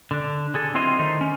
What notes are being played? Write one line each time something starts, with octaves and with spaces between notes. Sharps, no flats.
D3 D4
D3 G#4 A4
F#3 C4 E4 F4 C5 D#5
D3 D#3 A3 D#4 C5
C#4